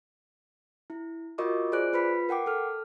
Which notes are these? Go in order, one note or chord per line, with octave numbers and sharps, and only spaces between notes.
E4
F4 F#4 A#4 D#5 C#6 D6
F4 G#4 C5 D5 F#6 D7
F4 B4 B5 B6
A#4 F#5 G5 D6
A4 F6